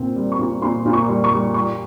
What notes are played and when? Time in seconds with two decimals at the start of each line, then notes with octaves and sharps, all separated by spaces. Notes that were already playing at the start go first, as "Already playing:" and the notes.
Already playing: A#2 C4
0.16 G3
0.32 C#6
0.39 A#2
0.61 A#2 C6
0.86 A#2
0.93 C#6
1.08 G3
1.24 C#6
1.31 G3
1.54 G3 C#6